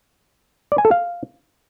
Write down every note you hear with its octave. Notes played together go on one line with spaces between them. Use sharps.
D5
G#5
A4
F5